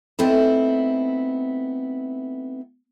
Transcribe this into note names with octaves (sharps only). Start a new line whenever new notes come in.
A3 B3 C4 D#4 E4 A4